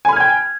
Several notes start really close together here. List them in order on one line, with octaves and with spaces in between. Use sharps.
G#5 B5 F6 G#6 G5